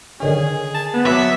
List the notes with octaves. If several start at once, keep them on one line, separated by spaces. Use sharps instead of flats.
D3 D#3 C#4 G#4
A5
B3
F#3 E5 D6